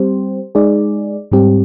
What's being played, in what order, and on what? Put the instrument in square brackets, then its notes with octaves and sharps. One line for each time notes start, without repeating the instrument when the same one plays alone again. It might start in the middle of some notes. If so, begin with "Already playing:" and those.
Already playing: [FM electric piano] G3 C4 G4 C5
G#3 D#4 G#4 D5
G#2 G3 C4 G4